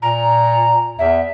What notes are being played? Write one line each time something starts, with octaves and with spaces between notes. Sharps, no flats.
A#2 A#5
E2 E5